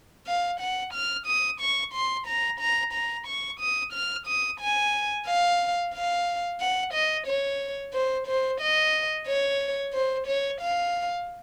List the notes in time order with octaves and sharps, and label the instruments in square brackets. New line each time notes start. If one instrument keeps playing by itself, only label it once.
[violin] F5
F#5
F6
D#6
C#6
C6
A#5
A#5
A#5
C#6
D#6
F6
D#6
G#5
F5
F5
F#5
D#5
C#5
C5
C5
D#5
C#5
C5
C#5
F5